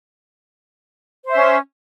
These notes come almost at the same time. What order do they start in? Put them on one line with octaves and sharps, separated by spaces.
C5 E5 C#4